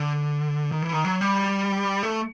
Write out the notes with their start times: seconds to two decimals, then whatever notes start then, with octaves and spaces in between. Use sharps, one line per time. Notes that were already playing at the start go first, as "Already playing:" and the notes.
Already playing: D3
0.72 D#3
0.82 E3
0.93 D#3
1.05 F#3
1.21 G3
2.03 A3